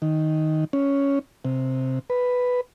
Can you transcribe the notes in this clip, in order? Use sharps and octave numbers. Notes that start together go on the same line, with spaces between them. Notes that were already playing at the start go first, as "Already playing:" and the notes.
D#3
C#4
C3
B4